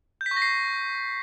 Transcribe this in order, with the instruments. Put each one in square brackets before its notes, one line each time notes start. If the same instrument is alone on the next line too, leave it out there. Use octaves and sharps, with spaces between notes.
[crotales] G6
B6
C#6
A#6
C7